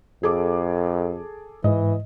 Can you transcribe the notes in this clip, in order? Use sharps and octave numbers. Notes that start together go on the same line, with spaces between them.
F2 G#4 A4 D6
G#2 E3 D#5